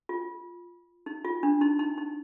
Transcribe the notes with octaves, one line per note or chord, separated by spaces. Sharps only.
F4
D#4
F4
D4
D#4
D#4
D#4